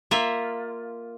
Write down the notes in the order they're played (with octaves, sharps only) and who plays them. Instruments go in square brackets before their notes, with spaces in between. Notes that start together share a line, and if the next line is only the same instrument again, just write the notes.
[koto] A#3 F4 E5